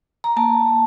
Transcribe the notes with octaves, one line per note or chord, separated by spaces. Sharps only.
A#5
A#3 A5